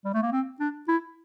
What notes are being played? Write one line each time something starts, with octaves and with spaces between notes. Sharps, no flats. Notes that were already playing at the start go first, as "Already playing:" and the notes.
G3
A3
A#3
C4
D4
E4